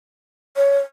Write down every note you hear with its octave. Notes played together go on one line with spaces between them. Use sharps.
C#5